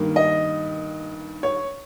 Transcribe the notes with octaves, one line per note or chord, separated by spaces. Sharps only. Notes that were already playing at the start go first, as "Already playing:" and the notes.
Already playing: G2 D#3 G3 A#3
D#5
C#5